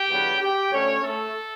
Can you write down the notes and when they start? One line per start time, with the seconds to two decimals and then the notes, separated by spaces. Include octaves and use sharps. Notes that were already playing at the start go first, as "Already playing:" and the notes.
Already playing: G4 G5
0.09 E2 D3 F#3 B3
0.40 G4 G5
0.71 D2 D3 A3 C#4 C#5
1.02 A3 A4